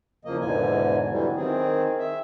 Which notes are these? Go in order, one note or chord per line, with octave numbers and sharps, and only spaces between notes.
E2 C#3 F3 A#3 D#5
E2 G#2 B2 D3 E3 G#5
D3 E3 F#3 G3
D#3 C4 G#4
E5